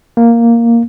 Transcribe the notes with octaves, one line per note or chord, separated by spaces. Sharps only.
A#3